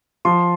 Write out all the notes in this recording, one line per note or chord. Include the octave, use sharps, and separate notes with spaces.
F3 C6